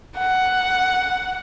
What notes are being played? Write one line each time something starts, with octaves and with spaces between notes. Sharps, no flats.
F#5